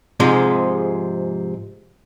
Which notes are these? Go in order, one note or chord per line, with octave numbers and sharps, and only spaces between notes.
G#2 C3 F3 G#3